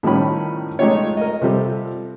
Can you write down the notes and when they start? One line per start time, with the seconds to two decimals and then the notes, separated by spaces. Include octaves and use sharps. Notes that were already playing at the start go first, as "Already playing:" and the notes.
0.03 A2 D#3 F3 G3 C#4 B5
0.79 G#3 A3 D#4 F4 G4 C#5
1.17 A#4 D#5
1.42 C3 F3 G3 A4